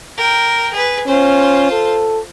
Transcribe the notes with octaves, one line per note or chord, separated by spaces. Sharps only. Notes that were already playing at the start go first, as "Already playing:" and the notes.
A#4 G5
G#4 B4
C#4 F4 C5
A4